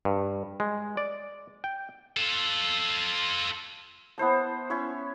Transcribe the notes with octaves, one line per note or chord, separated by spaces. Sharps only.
G2
G#3
D5
G5
F4 A4
B3 E4 C5 A5
C#4 E4 C#5 C#6